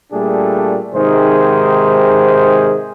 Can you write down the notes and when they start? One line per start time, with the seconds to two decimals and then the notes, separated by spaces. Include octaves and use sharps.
0.12 A#2 G3 A3 D4 G#4
0.94 G#2 C3 D#3 G#4 C5